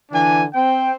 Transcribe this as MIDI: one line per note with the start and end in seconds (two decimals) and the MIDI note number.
0.11 0.43 50
0.11 0.43 52
0.11 0.43 62
0.11 0.43 80
0.54 0.92 60
0.54 0.92 79